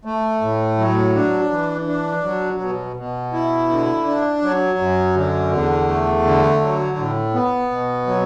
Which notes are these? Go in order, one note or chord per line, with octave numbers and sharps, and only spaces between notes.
A3
A2
F#3
D4
E3
D4
F#3
B2
B2
E4
D3
D4
F#3
F#2
D3
E2
A3
D3
F#3
A2
B3
B2
F#3